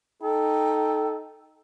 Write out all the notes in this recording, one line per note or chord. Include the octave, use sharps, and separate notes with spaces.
D#4 A4 G5